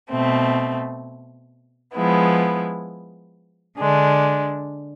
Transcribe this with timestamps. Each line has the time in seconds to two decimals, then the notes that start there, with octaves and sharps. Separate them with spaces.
0.10 B2 A3 C4
1.95 F3 G#3 B3 E4
3.78 D3 G#3 D4